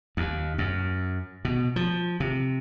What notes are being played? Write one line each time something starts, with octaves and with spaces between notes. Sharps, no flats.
D#2
F#2
B2
F3
C3